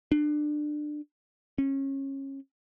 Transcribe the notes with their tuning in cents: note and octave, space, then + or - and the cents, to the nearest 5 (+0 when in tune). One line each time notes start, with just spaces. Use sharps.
D4 +25
C#4 -25